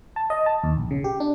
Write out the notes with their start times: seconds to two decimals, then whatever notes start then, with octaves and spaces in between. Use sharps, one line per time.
0.16 A5
0.30 D#5
0.46 A5
0.63 D#2
0.77 A#1
0.91 C#3
1.04 G4
1.20 D4